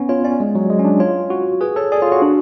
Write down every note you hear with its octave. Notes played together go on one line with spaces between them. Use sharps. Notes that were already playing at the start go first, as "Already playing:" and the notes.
Already playing: B3 C#4
F4 C#5
C#4 D5
G#3
F#3
G#3
C#4
D4
F4 C#5
F#4
G#4 B4
A4 C#5
G#4 D5
F4 C#5
F#4 C#5
D4